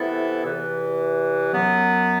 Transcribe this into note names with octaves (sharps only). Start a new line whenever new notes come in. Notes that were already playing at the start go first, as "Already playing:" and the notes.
Already playing: C3 E3 B3 E4 A4
E2 C3 E3
F#2 F#3 B3